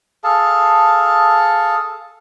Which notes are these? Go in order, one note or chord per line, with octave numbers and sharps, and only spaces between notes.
G#4 A4 F5 A5